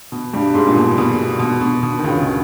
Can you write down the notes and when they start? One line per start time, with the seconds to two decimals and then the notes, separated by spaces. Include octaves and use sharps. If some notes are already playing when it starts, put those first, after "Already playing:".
0.12 B2
0.33 G2 G3
0.54 G#2 G#3
0.67 A#2
0.77 B2
0.98 B2
1.39 B2
1.61 B2
1.83 B2
1.99 D#3
2.04 C#2 C#3